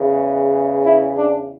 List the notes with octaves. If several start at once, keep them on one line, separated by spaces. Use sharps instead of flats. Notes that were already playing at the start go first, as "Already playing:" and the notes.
Already playing: E2 C#3 E3
E4
D4